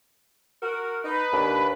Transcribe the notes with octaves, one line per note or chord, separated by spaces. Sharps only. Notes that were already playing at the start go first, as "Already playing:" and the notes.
F#4 A#4
D#4 B4
D#2 D4